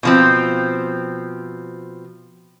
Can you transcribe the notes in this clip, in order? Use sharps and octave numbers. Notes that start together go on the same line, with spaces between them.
B2 F3 C4